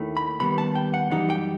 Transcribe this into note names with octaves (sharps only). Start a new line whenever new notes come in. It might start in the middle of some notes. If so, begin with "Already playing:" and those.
Already playing: D#2 D#3 A3 E4
B5
D#2 D#3 G3 B3 B5
A5
G5
F#5
F#2 E3 G3 D#4 F#5
G5